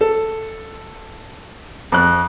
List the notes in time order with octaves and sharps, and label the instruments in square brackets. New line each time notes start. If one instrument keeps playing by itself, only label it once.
[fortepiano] A4
F2 F#6